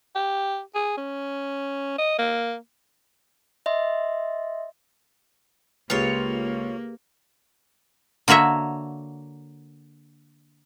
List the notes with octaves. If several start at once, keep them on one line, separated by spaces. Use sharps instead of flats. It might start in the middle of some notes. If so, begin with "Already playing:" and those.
G4
G#4
C#4
D#5
A#3
D#5 E5 C6
C#2 A#3 F4 G4 G#4 B4 C#5
D3 A#3 F#4 C#5 E5